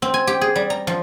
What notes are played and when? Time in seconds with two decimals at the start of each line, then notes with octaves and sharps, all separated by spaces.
0.02 C4
0.14 G#5
0.27 G4
0.41 G#4
0.56 G3
0.70 A#5
0.87 F3